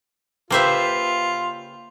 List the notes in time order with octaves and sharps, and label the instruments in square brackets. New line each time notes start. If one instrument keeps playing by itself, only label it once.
[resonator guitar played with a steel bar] C#3 G4 B4 [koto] A#3 C5 E5 [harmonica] F4